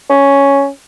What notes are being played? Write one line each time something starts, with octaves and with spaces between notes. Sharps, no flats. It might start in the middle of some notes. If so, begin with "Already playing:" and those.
C#4